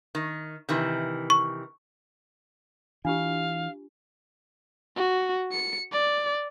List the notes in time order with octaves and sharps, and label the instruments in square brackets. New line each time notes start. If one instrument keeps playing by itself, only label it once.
[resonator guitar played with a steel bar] D#3
C3 D#3 E3
[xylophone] C#6
[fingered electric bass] E3 [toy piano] D4 F4 G4 [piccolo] F5
[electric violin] F#4
C#7
D5